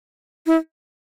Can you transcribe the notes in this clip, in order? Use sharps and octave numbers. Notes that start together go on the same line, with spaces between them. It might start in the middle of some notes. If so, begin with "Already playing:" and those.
E4